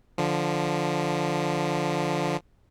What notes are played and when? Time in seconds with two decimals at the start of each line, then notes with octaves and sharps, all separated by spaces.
0.18 D3 F3